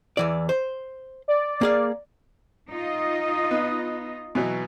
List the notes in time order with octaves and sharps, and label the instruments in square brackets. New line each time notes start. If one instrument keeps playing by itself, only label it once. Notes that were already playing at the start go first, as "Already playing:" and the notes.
[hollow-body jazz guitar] E2 E3 D5
C5
[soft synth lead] D5
[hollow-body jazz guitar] A#3 G#4 F5
[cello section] D#4 F4 D#5
[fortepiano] B3
B2 E3 F#3